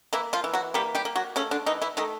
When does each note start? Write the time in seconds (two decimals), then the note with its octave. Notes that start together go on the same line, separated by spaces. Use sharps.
0.13 E3 A#3 E4
0.33 F3 F4
0.44 E3
0.53 F#3 F#4
0.74 G3 A#3 G4
0.95 G3 G4
1.05 A#3
1.16 F#3 F#4
1.36 C#3 A3 C#4
1.51 D3 D4
1.66 D#3 E3 D#4
1.82 E3 E4
1.97 D#3 A3 D#4